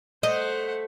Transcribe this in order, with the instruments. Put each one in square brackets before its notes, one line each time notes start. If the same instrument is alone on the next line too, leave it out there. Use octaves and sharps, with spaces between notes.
[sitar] A3 [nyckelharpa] C5 F#5 [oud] D#5